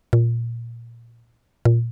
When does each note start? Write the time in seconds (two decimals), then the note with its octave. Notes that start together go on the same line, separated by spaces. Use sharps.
0.13 A#2
1.65 A#2